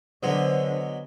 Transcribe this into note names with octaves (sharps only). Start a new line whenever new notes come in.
D3 F#3 G#3 B3 C5